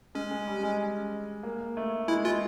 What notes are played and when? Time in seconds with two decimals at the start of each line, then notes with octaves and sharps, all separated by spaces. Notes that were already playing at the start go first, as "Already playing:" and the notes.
0.15 G#3 C#4
0.31 G#3
0.47 G3
0.63 G#3
1.43 A#3
1.77 A3
2.08 G#3 E4
2.24 G#3 F4